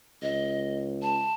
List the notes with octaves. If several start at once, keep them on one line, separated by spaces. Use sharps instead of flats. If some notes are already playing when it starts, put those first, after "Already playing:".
C#2 D#5
A5